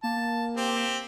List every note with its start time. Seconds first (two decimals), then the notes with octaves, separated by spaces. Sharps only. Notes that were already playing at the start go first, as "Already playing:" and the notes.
0.03 A#3 A5
0.57 C4 G4